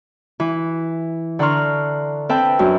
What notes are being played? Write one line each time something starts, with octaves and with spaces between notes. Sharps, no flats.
E3
D3 F#5 A#5 C6 C#6 F6
C4 A4 B4 E5 G5 A5
F#2 F#3 D4 F#4